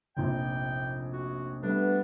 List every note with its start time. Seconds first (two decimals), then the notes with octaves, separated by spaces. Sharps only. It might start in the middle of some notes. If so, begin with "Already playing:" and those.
0.17 F1 A#1 G5
1.13 F#4
1.63 G3 A3 B3 D4 B4